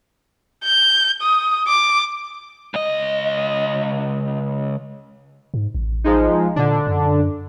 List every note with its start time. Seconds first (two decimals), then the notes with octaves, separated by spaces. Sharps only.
0.65 G6
1.22 D#6
1.68 D6
2.74 C#2 D#5
5.54 G#2
5.75 A1
6.04 F3 G#3 D#4
6.56 A#2 D3 D4
6.87 F#2